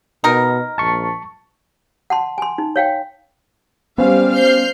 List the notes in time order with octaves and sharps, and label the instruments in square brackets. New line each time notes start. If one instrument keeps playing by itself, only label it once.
[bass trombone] B2 [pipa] D#4 A#4
[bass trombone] A#1 [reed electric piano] A5 C#6
[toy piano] F#5 A5 C6
G#5 C6
D#4
C#5 F5 G5
[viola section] G3 F5 [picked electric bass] B3 C#4 [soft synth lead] C5
[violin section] F6 G6 C7